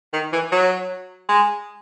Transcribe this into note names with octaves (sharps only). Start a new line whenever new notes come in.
D#3
E3
F#3
G#3